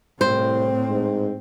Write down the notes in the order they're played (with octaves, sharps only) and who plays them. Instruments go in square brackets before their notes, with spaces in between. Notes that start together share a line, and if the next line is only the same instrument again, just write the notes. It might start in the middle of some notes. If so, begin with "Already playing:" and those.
[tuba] C2 [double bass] A2 C4 [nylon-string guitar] C5
[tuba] G#2